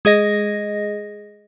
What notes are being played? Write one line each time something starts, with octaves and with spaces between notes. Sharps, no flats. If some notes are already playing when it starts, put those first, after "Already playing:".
G#3 G#4 D#5 A#6